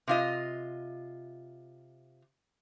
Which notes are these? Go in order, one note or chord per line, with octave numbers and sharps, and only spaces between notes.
C3 F4 D#5